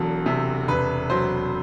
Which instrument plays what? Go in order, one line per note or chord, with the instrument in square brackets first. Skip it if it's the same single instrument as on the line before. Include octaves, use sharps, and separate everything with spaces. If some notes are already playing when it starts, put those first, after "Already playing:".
Already playing: [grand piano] E1 E2 F#3 A4
C3
E1 B4
F#3 C5